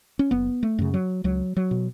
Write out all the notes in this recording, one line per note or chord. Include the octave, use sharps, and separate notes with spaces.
C#4
F#1 B3
A3
F#2 C#3
F#3
C#2 F#3
F#3
B2